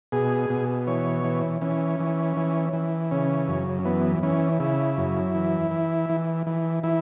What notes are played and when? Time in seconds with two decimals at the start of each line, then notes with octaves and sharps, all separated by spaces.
0.12 B2 G#4
0.50 B2
0.87 E3 C#5
1.24 E3
1.61 E3 C#4
2.00 E3
2.37 E3
2.73 E3
3.11 C#3 C#4
3.48 F#2
3.85 E3 B3
4.23 E3 C#4
4.60 C#3 E4
4.98 F#2
5.35 E3
5.71 E3
6.09 E3
6.47 E3
6.83 E3 E4